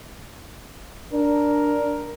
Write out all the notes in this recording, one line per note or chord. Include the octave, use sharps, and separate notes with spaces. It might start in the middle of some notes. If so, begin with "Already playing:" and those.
D4 A#4